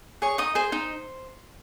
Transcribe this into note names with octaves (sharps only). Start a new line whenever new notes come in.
G#4 C#5 C#6
D#4 D#5 D#6
G#4 C5 C6
D#4